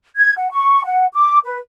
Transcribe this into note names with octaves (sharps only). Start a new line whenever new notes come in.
G#6
F#5
C#6
F#5
D6
B4